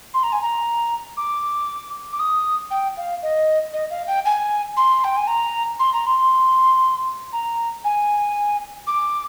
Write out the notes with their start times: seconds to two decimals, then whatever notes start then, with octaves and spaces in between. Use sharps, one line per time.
0.14 C6
0.23 A#5
0.32 G#5
0.41 A#5
1.17 D6
2.13 D6
2.19 D#6
2.71 G5
2.97 F5
3.22 D#5
3.73 D#5
3.90 F5
4.07 G5
4.25 G#5
4.77 C6
5.04 G5
5.16 G#5
5.27 A#5
5.79 C6
5.93 A#5
6.06 C6
7.33 A#5
7.84 G#5
8.87 D6